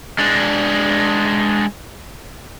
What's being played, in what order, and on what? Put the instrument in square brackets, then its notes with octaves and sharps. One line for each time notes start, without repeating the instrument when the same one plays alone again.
[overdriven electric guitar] G#3 D4